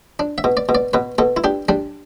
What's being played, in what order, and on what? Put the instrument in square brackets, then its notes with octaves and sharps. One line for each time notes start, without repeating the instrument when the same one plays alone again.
[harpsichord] D4
E5
B2
D5
B2
D5
B2 B4
B2 A4
E4
D4 G4
G3 D4